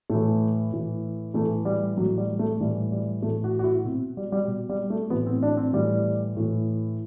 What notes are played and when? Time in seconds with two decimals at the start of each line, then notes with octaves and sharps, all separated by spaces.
0.10 A2 E3 A3
0.72 A2 E3
1.34 A2 E3 A3
1.65 G3
1.97 A2 E3 F#3
2.18 G3
2.39 A3
2.60 A2 E3 G3
2.92 G3
3.23 A2 E3 A3
3.44 F#4
3.59 F#4
3.64 E4
3.85 B2 C4
4.17 G3
4.32 G3
4.48 B2
4.69 G3
4.90 A3
5.10 A2 E3 B3
5.26 C4
5.43 D4
5.57 C4
5.73 A2 E3 G3
6.37 A2 E3